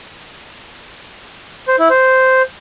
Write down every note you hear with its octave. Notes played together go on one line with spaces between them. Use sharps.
C5
E4
C5